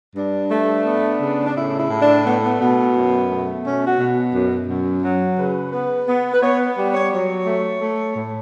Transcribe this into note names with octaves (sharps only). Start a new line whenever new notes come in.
G2 D4
A3
B3
C#3
D4
A2 E4
E4
A2
D4
A3 B3
B3
B2 B3
F#2
A3
B2 C#4
F#4
B2
F#2
F#2
F#3
C#3 B4
B3 B4
B3
B4
B3 C#5
G3
C#5
F#3 C#5
A3
A3
A2